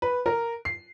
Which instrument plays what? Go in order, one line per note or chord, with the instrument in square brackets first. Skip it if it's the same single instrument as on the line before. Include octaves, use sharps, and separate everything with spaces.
[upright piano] B4
A#4
C7